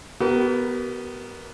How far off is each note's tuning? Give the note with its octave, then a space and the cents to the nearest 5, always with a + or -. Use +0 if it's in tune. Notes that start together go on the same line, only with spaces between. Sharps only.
B3 +0 G4 -45 A#4 +0